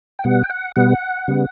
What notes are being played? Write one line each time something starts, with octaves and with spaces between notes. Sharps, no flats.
G5
B2 G3 B3 F#5
G5
F#5
B2 G3 B3 F#5
C#3 G3 B3